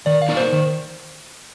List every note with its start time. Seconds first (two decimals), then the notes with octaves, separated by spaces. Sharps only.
0.06 D#3 D5
0.22 F5
0.29 A#3 D#4 A#4 D5
0.37 C5
0.53 D#3